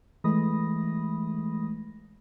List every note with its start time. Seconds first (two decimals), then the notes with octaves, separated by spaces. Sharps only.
0.24 E3 G#3 A3 B5 D#6 A#6